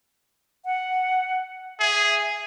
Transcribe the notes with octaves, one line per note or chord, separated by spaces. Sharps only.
F#5
G#4 E5